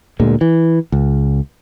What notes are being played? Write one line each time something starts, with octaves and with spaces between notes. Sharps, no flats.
D2 A#2 G#3
E3
C#2